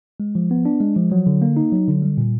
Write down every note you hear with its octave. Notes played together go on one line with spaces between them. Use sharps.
G#3
F3
B3
D4
G#3
F3
F#3
D3
A#3
D#4
F#3
D3
G3
A#2